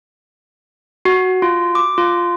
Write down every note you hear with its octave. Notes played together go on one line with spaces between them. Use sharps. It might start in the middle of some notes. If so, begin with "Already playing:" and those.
F#4
F4
D6
F4